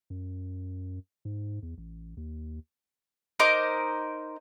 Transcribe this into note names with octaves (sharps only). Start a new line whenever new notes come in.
F#2
G#2
E2
A1
D#2
D#4 A#4 C5 D6